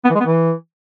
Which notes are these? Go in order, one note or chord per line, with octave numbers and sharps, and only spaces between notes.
B3
E3
G#3
B3
E3